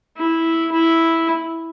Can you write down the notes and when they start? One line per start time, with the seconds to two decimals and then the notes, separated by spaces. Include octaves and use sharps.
0.17 E4
0.72 E4